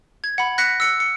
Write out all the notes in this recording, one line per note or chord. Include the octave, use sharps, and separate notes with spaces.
G#6
F#5 B5
F#6 A#6 B6 C#7
E6 C#7
C#7